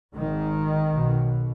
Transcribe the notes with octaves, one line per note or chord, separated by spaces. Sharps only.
G#1 G#2 D#3
B1 B2